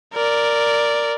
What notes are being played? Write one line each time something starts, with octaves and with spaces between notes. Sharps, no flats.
A#4 D5